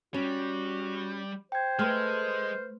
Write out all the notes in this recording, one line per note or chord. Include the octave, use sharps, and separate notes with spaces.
G3 C#4 F#4
C5 G5 G#6
G#3 A3 B4 C6 F6